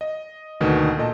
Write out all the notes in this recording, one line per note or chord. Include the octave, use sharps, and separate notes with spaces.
D#5
D2 B2 D3 D#3 A#3 B3
A#2 A4 D#5 A5